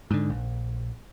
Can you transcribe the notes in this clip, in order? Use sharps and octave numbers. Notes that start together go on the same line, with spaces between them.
G#2 D3
A#1